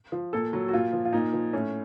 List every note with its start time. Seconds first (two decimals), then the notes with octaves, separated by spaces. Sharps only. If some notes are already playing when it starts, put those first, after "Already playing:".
0.12 F3
0.33 A#2 A4
0.53 F#3
0.68 F#4
0.73 A#2 F4
0.93 F3
1.05 F4
1.13 A#2 D#4
1.33 F3
1.53 A2 C#4